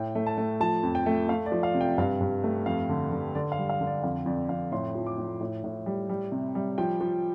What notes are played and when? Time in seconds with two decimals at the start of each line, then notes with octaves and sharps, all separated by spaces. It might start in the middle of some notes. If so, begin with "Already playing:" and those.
Already playing: A2 G5
0.15 A3
0.27 A5
0.38 A3
0.60 F3 A5
0.83 F2
0.95 G5
1.06 A3
1.29 A3 F5
1.46 D5
1.52 F3
1.63 F5
1.74 C3
1.81 G5
1.98 G2 F5
2.21 G2
2.44 A3
2.66 F2 F5
2.89 D3
3.12 D3
3.35 D3 D5
3.52 F5
3.58 G3
3.69 F5
3.81 D3
3.87 D5
4.04 F2 F5
4.26 F2 D5
4.49 F2 F5
4.72 A2 C6
4.95 F3
5.06 D6
5.18 A2
5.41 A2
5.64 A2
5.86 G3
6.09 G3
6.32 C3
6.55 G3
6.78 F3 G5
7.01 F3